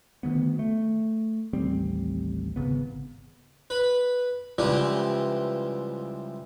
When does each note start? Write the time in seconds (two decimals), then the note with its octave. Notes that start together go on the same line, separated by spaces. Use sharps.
0.23 D2 D#3 F#3 B3
0.59 A3
1.53 A1 D#2 G3 C4
2.56 G#1 C#3 B3
3.70 B4 B5
4.58 C#2 E3 F3 G3 D4